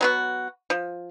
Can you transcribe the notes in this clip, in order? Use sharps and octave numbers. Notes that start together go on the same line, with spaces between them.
F#3 B3 F#4
F3